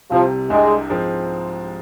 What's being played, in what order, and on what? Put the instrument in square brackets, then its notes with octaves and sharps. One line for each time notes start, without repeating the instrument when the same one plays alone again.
[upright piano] C2 C3 G3 [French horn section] F3
[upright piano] C2 C3 G3 D4 [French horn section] G#3
[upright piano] G#2 F3 G#3 C4